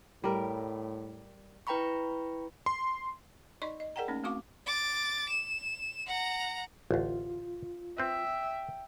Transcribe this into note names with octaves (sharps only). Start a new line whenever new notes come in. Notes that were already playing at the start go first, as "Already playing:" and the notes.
A2 G3 A#4
E4 B4 G5 A#5 B5 C#6
C6
D#4 D5 D#5 C6 C#6
D#5
G#4 A#4 D5 F#5 G5 A#5
A3 A#3 C#4 D#4
A3 C4 F#4 F5 C#6 D6
D6 A6
E7
F#5 A#5
A1 D2 F4
C4 B4 E5 G5